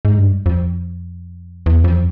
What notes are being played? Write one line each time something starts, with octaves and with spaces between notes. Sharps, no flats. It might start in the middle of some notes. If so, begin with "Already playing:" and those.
G#2
G2
F2
E2
F2